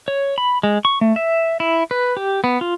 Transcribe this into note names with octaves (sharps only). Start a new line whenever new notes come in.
C#5
B5
G#3
C#6
A3
E5
E4
B4
G4
B3
F4